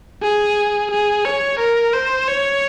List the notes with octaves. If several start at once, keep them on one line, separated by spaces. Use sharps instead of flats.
G#4
G#4
C#5
A#4
C5
C#5